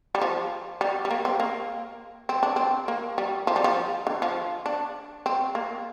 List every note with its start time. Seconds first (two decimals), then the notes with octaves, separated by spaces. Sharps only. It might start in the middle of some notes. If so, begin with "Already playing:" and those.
0.15 G3
0.22 F3
0.81 G3
1.05 G3
1.11 A#3
1.25 C4
1.40 A#3
2.29 C4
2.43 D4
2.56 C4
2.88 A#3
3.18 G3
3.47 F3
3.56 G3
3.64 F3
4.07 D3
4.22 F3
4.66 D4
5.26 C4
5.55 A#3